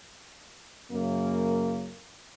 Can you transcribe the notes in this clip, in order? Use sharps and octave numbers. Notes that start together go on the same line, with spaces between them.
F#2 C#3 A#3